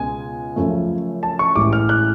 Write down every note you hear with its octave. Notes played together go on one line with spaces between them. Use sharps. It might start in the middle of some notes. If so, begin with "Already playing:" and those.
Already playing: C#2 B2 G#3 G#5
F#2 C#3 F3 A3
A5
C#6
A1 A2 G#3 D6
F6
F#6